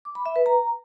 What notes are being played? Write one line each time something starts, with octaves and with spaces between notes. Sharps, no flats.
D6
B5
E5
B4
A#5